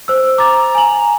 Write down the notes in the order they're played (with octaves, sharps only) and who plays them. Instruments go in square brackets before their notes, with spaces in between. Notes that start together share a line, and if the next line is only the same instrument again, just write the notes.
[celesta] C5 E6
[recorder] A#5 [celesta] D6 A6
[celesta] G#5 F#7